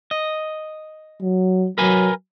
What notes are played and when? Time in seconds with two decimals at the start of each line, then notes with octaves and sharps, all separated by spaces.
0.11 D#5
1.22 F#3
1.78 F#3 A#4 B4 G#5